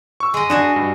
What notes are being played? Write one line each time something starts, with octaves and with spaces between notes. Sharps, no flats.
C#6 E6
G#3 D#5
D4 F#4 G#4 D#5 E7
G2